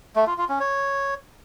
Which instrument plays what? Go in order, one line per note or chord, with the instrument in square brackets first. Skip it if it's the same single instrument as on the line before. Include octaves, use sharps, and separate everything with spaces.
[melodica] A3
F4
F4
C#4
C#5